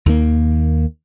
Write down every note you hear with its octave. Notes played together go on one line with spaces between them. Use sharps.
D#2 D#3 A#3